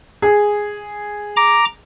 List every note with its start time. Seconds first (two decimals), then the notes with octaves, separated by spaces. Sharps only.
0.22 G#4
1.37 A#5 D6